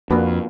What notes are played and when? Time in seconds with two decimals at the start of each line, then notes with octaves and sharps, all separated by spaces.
0.10 F2 A#3 D4 F#4 B4